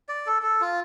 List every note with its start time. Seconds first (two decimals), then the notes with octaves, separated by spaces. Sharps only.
0.09 D5
0.26 A4
0.42 A4
0.61 F4